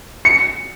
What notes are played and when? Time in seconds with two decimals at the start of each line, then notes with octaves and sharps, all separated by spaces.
0.25 C#7